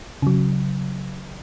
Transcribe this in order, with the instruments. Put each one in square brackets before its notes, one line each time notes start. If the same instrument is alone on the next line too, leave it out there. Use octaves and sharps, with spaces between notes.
[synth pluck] C#3 F#3